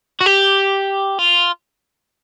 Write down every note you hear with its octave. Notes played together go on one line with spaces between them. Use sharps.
F#4
G4
F4